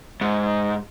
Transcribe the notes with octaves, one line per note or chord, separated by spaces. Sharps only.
G#2